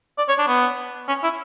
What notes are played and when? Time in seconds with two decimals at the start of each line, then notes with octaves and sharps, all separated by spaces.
0.18 D5
0.28 C#5
0.39 D4
0.48 B3
1.08 C#4
1.23 E4